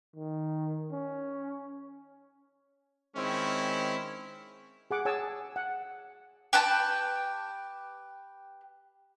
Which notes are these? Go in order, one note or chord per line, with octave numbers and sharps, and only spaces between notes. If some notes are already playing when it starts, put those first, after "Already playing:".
D#3
C#4
D#3 G#3 C4 C#4 E4
G#4 F#5 D6
G#4 C#5 G#5 A5 E6
F#5
G4 B4 G5 A5